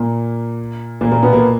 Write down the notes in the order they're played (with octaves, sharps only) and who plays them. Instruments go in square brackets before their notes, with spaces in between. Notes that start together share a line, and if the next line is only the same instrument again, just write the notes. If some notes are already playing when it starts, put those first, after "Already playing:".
Already playing: [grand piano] A#2 A#3
A#2 A#3
A#2 A#3
B2 B3
A#2 A#3